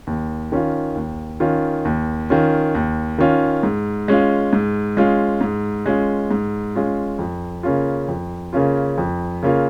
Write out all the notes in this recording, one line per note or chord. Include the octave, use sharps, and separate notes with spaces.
D#2
D#3 C#4 F4
D#2
D#3 C#4 F4
D#2
D#3 C#4 F4
D#2
D#3 C#4 F4
G#2
G#3 C#4 F4
G#2
G#3 C#4 F4
G#2
G#3 C#4 F4
G#2
G#3 C#4 F4
F2
C#3 A#3 C#4 F4
F2
C#3 A#3 C#4 F4
F2
C#3 A#3 C#4 F4